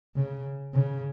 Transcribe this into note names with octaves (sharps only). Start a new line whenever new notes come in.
C#3
C#3